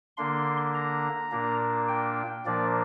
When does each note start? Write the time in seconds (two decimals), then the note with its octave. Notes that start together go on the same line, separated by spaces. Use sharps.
0.17 D3 A#3 D4 C6
0.75 A#5
1.31 A#2 A#3 D4
1.88 G5
2.46 A#2 F3 A#3 D4 D5